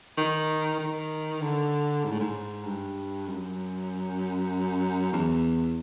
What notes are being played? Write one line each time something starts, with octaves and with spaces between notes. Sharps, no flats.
D#3
D#3
D3
G#2
A2
G#2
G2
F#2
E2